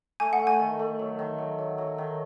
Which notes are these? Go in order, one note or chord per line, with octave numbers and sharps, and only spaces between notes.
A3 G#5
F#5
A3
G#5
D#3
A3
F#3
D#3
F#3
F#3
F#3
D#3